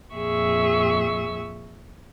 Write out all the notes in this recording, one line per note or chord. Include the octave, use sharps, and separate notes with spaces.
F2 A#2 G#4 E5 C#6 E6